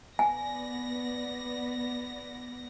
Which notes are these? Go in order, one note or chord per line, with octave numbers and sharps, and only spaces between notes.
B3 D5 G#5 A#6